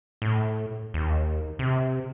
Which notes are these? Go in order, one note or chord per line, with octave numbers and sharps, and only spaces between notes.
A2
D#2
C3